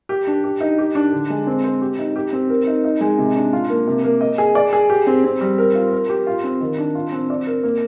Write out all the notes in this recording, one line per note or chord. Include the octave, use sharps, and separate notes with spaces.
G4
D4
G4
D#4
G4
D4
D3
G#3
C4
C5
G4
D#4
G4
C4
A#4
D#4
D#4
G#3
C3
D4
F4
A#3
C3
A#3
D#5
G#4
D5
G#4
G4
C4
C4
G3
A#4
F4
A#4
G4
F4
C4
D#3
D4
F4
C4
D5
A#4
A#3